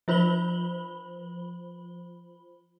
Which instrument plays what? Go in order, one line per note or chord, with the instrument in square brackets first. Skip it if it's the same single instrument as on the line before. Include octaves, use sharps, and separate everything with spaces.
[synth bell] F3 F4 C5 B5 F#7 G7